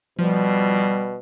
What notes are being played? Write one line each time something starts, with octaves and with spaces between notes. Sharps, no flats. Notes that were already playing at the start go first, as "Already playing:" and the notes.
B2 F3 G3